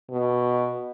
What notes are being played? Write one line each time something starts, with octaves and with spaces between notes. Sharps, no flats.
B2